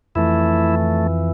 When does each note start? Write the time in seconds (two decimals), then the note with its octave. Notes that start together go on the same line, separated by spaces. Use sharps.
0.15 F2 E3 A3 E4